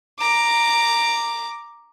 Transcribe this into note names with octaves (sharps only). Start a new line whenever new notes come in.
A#5 D6